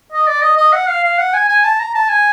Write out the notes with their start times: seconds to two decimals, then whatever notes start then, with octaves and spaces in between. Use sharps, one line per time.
0.12 D#5
0.28 D5
0.42 D#5
0.57 D#5
0.73 F#5
0.89 F5
1.04 F5
1.18 F#5
1.34 G#5
1.49 G#5
1.64 A5
1.80 A#5
1.94 A5
2.09 G#5